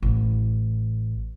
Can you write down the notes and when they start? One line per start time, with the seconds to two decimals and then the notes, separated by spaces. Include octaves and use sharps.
0.02 A1